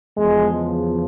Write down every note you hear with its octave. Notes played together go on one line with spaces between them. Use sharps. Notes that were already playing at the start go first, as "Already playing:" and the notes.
E2 C#3 F3 G#3